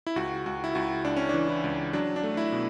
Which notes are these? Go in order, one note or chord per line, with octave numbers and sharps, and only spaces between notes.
E4
C#2 F#4
C#2 F#4
E4
C#2 F#4
C#2 D4
C#4
E3 D4
E4
C#2
F#3 D4
D4
A3
E4
B2